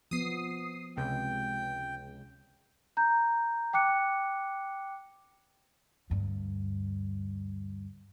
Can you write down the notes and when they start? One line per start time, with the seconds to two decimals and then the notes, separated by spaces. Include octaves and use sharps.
0.11 F3 B3 D#6 C7
0.97 C#2 C3 G5
2.97 A#5 G6
3.73 G5 D6 F#6 C#7
6.10 D2 G2